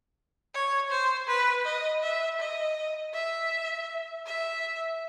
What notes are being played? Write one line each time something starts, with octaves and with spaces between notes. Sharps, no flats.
C#5
C5
B4
D#5
E5
D#5
E5
E5